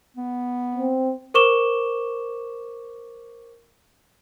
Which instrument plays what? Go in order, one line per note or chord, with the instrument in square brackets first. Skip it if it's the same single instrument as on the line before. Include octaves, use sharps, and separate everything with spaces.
[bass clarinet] B3
[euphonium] C4
[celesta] A#4 C5 C#6 D6 E7 G7